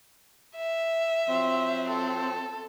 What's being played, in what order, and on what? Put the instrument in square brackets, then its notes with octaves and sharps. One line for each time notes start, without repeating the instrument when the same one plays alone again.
[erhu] E5
[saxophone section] F3 F#3 C4
[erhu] A4